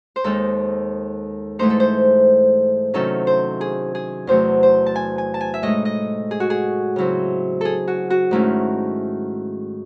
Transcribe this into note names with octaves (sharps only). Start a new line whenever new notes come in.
C5
D#2 D#3 G#3 D#4 A4
G#2 E3 A3 D#4 C5
A4
C5
C3 D#3 F#3 C#4 E4 A4
C5
G#4
G#4
E2 C3 F#3 A3 C5
C5
A5
G#5
G#5
A5
G#5
E5
A2 G#3 D#4 D#5
D#5
G#4
F#4
G#4
C#3 F#3 C4 E4
G#4 A4
F#4
F#4
G#2 D#3 A3 C#4 E4